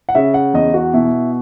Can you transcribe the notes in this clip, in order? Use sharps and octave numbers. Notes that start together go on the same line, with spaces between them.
F#5
C#3 E5
F#5
E2 D#5
F#4
B2 E4